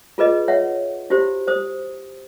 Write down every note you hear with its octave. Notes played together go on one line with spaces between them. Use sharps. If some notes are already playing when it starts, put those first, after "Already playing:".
F4 G#4 B4 D#5
C#5 E5 F#5
E4 F#4 G4 C5
C5 D#6